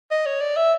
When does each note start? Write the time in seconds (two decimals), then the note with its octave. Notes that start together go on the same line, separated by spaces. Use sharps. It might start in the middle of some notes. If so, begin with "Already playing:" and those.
0.11 D#5
0.26 C#5
0.41 D5
0.57 E5